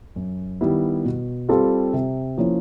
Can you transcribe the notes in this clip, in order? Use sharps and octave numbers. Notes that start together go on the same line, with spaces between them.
F#2
D#3 G3 B3 E4
B2
G3 C4 F4 A4
C3
F3 A#3 C#4 E4